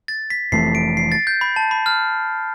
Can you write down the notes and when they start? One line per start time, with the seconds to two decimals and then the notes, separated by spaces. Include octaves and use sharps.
0.08 A6
0.30 B6
0.52 F1 F2 E3 A3 C7
0.75 D7
0.97 C7
1.12 A6
1.27 G6
1.41 B5
1.56 A5
1.71 B5
1.86 F6